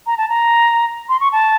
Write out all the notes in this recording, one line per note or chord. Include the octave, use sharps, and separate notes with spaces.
A#5
A5
A#5
C6
C#6
A5